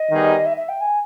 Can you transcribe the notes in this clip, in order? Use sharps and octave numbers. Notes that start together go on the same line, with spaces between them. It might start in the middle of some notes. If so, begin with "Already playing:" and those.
Already playing: D#5
D#3 G3 B3 D#4 G#4
E5
E5
G5
G#5